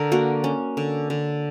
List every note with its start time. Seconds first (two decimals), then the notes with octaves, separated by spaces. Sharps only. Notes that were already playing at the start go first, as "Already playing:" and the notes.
Already playing: D3 A#4
0.12 A#3 F#4
0.44 C#4
0.77 D3
1.10 D3